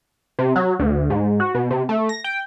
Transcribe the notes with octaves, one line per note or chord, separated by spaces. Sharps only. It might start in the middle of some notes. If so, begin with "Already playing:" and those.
C3
F#3
D2
G#2
F#4
B2
C3
A3
A#6
G5